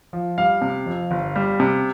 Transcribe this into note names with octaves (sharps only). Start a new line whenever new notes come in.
F3
G3 F5
C3
F2
G1
G3
C3